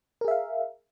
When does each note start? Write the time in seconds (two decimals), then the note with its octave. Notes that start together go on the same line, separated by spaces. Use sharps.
0.21 A#4
0.25 G#4
0.28 E5
0.31 F5